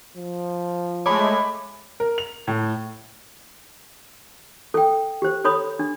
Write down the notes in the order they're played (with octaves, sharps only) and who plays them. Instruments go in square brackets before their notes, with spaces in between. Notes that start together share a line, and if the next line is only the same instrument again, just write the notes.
[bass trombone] F3
[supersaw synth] G#3 A3 [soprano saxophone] C#5 [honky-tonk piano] B5 D6
[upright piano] A#4
F7
A2
[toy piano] A4 G5
G4 C5
A4 C#5 B5 D#6
D4